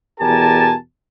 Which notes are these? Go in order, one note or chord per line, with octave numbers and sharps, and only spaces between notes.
E2 B2 G4 A#4 G#5 A5